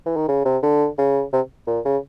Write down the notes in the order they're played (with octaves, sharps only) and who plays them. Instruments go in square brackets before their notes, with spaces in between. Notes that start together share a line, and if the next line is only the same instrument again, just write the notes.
[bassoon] E3
D#3
C#3
C3
D3
C#3
C3
A#2
C#3